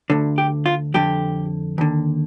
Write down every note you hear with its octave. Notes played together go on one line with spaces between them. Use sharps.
D2 D3
G4
F4
F2 D3 G4
D#2 D3